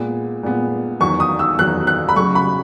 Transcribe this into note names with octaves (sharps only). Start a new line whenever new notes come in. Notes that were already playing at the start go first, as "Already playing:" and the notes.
Already playing: A#2 G#3 B3
A#2 G#3 B3
E2 D#3 F#3 C#6
D#6
E6
E2 D#3 F#3 F#6
F#6
B5
F#2 C#3 F#3 C#6
B5